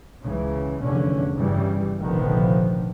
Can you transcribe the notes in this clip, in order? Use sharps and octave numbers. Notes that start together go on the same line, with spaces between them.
C#2 C#3 E3
F1 E2 D3 C#4
G1 C#3 E3 G3
F1 A#1 D3 D#3 F3 B3